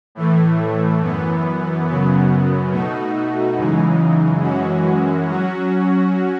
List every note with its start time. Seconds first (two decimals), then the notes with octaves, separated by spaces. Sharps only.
0.15 A2 E3 A3
1.01 F#2 E3 B3
1.87 F#2 C#3 F#3 B3
2.71 B2 A3 D#4 F#4
3.57 F#2 C#3 E3 G#3 D#4
4.42 F#2 E3 G#3 C#4 F#4
5.28 F#3 C#4 F#4